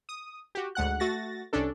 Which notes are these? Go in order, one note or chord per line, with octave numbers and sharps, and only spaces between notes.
D#6
F#4 G4
D2 G#2 F#5 F#6
A3 F#4 A6 A#6
C2 C#4 D4 A4